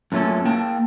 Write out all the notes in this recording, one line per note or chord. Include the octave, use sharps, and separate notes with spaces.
F#2 A#2 A3 C#4 A4
A#3 G5 A5